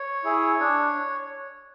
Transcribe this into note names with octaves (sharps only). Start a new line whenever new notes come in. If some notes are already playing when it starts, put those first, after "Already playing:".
Already playing: C#5
E4 G#4
D4